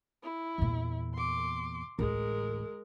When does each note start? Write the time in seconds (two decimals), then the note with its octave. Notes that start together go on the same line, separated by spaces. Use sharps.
0.23 E4
0.58 E2 A#2
1.14 C6 D6
1.99 A1 D2 G#3 A#4